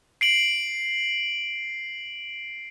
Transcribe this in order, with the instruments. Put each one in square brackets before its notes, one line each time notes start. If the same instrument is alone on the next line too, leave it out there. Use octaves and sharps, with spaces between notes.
[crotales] C7 D7 F#7